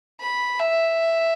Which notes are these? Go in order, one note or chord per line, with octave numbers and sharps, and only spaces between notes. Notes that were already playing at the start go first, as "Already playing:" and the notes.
B5
E5